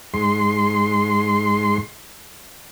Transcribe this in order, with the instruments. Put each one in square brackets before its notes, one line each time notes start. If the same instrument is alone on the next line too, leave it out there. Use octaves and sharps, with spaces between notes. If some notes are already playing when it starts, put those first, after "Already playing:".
[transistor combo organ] G#2 C6